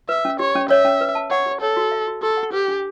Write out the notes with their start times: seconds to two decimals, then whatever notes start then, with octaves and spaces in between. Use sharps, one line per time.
0.09 B4 E5
0.25 C#4
0.39 G4 C#5
0.55 C#4
0.70 C#5 E5
0.85 C#4
1.01 B4
1.15 A5
1.31 C#5 F#5
1.46 G4
1.61 A4 C#5
1.77 F#4
1.92 E5
2.07 F#4
2.22 G4 A4
2.37 F#5
2.52 G4 B4
2.68 D4